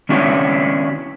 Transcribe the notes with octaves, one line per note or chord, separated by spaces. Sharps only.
D#3 C#4 D4 E4 F#4 C#5